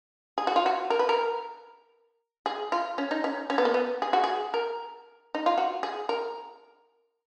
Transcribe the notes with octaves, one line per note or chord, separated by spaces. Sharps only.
G#4
F#4
F4
F#4
A#4
B4
A#4
G#4
F4
C#4
D#4
C#4
C#4
B3
A#3
B3
G#4
F#4
G#4
A#4
D#4
F4
F#4
G#4
A#4